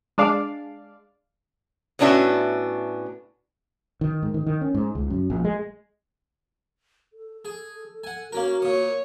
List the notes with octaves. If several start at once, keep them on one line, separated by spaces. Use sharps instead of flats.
G#3 D4 D5 F5
A2 B3 C#4 D4 F#4 E5
D#3
G#2
D#3
D#3
C#4
G#2
C#2
F#2
A#1
G#3
A4
G#4
F#5 G#5
A#3 C#4 F#4 A#4
A#2 C#5 D#6